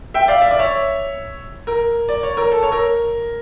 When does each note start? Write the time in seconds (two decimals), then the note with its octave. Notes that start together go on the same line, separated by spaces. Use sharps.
0.14 E5 G5
0.28 D5 F5
0.42 E5
0.51 D5
0.59 C#5 E5
1.67 A#4
2.09 D5
2.23 C#5
2.37 A#4
2.51 A4
2.63 C#5
2.72 A#4